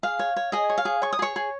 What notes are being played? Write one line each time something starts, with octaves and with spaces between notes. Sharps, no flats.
G#4 F5
C#5
C#5
G#4 D#5
C#5
F5
G#4
C#5 C#6
D#6
G#4 C#5 C#6
G#4